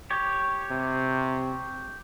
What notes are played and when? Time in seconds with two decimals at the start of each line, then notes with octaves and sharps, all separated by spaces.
0.10 G4 C#5
0.71 C3